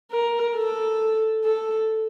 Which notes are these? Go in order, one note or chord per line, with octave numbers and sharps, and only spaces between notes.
A#4
A4
A4